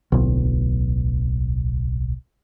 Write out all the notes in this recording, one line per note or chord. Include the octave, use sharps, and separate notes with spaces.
D1 B1